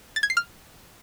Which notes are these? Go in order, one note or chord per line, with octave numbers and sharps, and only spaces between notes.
A6
G#6
C7
F6